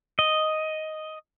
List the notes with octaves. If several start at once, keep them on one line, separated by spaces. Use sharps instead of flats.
D#5